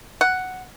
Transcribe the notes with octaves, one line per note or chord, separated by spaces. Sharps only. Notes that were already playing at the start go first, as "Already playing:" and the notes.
F#5